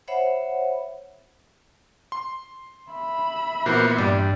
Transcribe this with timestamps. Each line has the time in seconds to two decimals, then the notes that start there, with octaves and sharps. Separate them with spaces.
0.08 C5 C#5 E5 F#5 B5
2.12 C6
2.92 E5 B5
3.66 A#2 E3 B3 F#4 A#4 C5
3.98 G2 G3